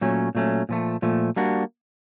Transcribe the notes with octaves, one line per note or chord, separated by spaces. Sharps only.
A#2 F#3 A3 C#4
A#2 F#3 A3 C#4
A#2 F3 A3
A#2 F3 A3
G3 A#3 D4 F#4